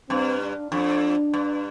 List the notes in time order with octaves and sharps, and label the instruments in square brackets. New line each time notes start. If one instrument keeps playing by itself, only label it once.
[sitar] G2 [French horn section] C4
[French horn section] D4
[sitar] F2 [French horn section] D4
[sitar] G2